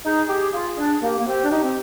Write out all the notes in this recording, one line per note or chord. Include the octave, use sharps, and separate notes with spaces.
D#4 G#4
G4
F4
D4
A#3 G4
A#3
C4 G4
D4
D#4 G4
C4